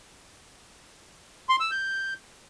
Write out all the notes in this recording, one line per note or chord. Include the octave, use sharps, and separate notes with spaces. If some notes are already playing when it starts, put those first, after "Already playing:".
C6
E6
G6